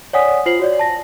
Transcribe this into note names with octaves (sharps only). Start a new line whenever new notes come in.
C#5 D5 F#5 G#5 D#6 B6
F4 C5 C7 F#7
F#4 C#5 D5
A5 A#6